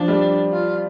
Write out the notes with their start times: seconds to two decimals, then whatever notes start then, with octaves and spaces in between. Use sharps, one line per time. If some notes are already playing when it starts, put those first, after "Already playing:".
Already playing: F3 D4
0.08 G3
0.53 F4